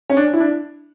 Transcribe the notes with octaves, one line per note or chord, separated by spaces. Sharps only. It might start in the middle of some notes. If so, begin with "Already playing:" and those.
C#4
D4
E4
D4